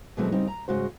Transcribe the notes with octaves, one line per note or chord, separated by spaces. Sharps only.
B2 E3 F#3 G#3 A3 C4
C#3 G3 C4 D#4
A#5
G#2 C#3 G#3 F#4 C5